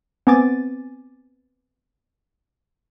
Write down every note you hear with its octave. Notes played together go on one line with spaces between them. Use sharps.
B3 C4 G#5 D6 A6